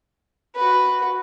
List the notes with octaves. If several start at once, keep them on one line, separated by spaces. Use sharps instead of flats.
F#4 B4